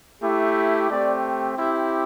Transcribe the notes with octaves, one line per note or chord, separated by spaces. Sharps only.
A3 E4 G4
A3 C4 G4 D5
C4 E4 G4 E5